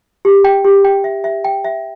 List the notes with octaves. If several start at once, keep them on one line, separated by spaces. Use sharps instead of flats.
G4
G5
G4
G5
E5
E5
G5
E5